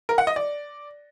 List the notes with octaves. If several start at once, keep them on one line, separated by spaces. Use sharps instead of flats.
A#4
F#5
D#5
D5